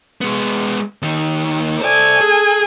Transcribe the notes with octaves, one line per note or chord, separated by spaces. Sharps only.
G#3 B3
D#2 D#3
A4 C5 D5 G#5
G#4